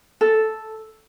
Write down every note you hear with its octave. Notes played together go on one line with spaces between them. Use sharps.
A4